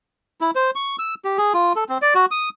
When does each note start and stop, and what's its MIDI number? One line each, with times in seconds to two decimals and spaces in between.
0.41 0.51 64
0.55 0.71 72
0.75 0.96 85
0.99 1.15 88
1.25 1.37 67
1.38 1.53 68
1.54 1.73 65
1.76 1.84 69
1.89 1.98 60
2.02 2.14 74
2.15 2.26 66
2.31 2.49 87